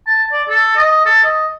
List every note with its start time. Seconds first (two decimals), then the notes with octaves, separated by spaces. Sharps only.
0.07 A5
0.32 D5
0.49 A4
0.76 D#5
1.06 A4
1.24 D#5